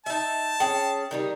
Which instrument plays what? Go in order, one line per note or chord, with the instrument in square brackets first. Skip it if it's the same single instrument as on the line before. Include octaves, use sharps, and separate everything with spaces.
[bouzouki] D#4 E5 [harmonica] A5
[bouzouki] C#4 G#4 [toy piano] G5
[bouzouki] D#3 G3 D#4